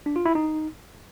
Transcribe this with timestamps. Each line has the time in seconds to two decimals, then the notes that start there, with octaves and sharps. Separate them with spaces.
0.06 D4
0.16 F4
0.26 E4
0.35 D#4